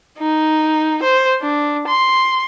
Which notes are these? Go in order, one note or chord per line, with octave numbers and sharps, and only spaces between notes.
D#4
C5
D4
C6